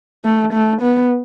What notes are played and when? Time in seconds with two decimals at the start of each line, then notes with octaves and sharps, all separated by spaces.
0.25 A3
0.53 A3
0.82 B3